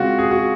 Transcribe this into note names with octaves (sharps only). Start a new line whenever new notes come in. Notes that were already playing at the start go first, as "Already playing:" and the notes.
Already playing: C#3 G#3 C4 F4 F#4
G#4
F#4